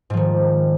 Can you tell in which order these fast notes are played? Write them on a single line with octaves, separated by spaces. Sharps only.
G#2 F3 D#3